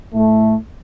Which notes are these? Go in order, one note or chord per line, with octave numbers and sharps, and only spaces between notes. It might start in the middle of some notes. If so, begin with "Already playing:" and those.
A2 A3